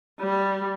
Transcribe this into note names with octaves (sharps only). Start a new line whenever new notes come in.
G3